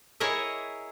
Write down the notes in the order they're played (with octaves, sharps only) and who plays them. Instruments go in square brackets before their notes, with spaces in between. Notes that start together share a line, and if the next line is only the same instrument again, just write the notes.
[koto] E4 G#4 A#4 C#5 D#5 E5